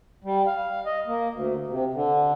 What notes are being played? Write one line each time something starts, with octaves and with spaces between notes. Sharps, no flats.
G3
F5
D#5
A#3
D2
C3
D3